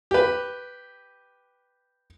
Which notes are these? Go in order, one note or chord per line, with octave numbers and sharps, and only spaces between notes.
G4 B4